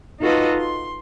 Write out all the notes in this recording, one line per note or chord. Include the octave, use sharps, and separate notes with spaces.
D#4 F4 F#4 A4 B4 D#5
C6